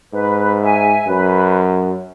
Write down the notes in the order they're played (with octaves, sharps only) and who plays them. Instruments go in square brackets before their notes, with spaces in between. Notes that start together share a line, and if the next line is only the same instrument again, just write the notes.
[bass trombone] G#2 [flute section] B4
[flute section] E5 G#5
[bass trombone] F#2 [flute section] B4